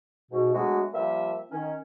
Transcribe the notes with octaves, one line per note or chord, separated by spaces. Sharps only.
G#2 B2
F#3 G#3 A3 B3 D4 F#4
F3 G3 A#3 E5
D#3 C#4